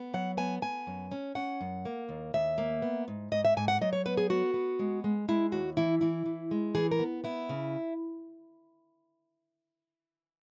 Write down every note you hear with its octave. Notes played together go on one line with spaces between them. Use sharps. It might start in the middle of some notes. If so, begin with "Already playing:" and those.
Already playing: B3
F#3 F#5
B3 G#5
B3 G#5
F#2
C#4
C#4 F#5
F#2
A#3
D#2
D#2 E5
A#3
B3
G#2
G#2 D#5
E5
G#2 G#5
F#5
F#3 D#5
C#5
B3 B4
G#4
B3 F#4
B3
G#3
G#3
G#3 E4
D#2 F#4
E3 E4
E3 E4
E3
G#3
E3 G#4
A#4
B3
B3 E4
C#3